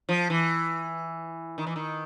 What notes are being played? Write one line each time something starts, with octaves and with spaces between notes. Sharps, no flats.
F3
E3
D#3
E3
D#3